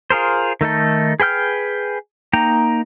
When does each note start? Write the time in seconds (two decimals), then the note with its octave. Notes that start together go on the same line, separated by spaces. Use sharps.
0.10 F4 G#4 A#4 C5
0.61 D#3 A3 D#4 A4
1.20 G#4 B4 G5 F6 G6
2.33 A#3 D#4 G5 A#5